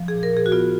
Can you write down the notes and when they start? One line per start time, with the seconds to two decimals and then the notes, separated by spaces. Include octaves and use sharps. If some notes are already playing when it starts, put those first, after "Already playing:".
Already playing: F3
0.08 G#4
0.13 A#2
0.23 A#4
0.33 A#2 G#4
0.46 F#4
0.52 B3 F4